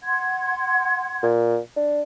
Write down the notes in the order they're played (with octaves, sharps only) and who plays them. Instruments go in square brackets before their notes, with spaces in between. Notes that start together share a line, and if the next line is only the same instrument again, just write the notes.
[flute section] F#5 C6 G#6
[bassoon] A#2
D4